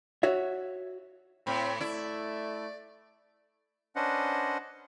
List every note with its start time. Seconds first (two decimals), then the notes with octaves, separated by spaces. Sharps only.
0.23 F#4 C#5 E5
1.47 A2 C4 B5
1.81 A3 E4 D5
3.96 C#4 D4 B4 C5 D#5 F#5